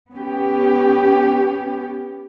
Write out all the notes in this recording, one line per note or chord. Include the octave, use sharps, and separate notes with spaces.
B3 C#4 G4